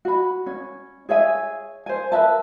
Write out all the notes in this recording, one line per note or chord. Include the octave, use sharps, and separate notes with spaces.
F#4 B5
C#4
G#4 C#5 E5 G#5
C5 G#5
A#4 B4 E5 A5